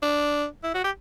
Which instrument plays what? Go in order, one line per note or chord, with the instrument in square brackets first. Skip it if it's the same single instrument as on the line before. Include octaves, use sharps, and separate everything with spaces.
[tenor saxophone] D4
E4
F#4
G4